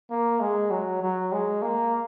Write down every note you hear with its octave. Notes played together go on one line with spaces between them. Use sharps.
A#3
G#3
F#3
F#3
G#3
A#3